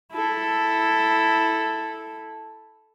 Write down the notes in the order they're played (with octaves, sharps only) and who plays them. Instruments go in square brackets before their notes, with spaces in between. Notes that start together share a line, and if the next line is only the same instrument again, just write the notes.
[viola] E4 A4